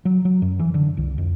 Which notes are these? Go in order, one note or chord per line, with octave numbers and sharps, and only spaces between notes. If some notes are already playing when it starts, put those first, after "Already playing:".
F#3
F#3
F#2
E3
D3
C2
F2